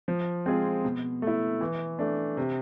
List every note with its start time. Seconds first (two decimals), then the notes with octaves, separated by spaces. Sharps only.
0.08 F3
0.46 G#3 C4 F4 G#4
0.85 B2
1.22 A3
1.27 E4
1.61 E3
1.99 A3 D4
2.37 C3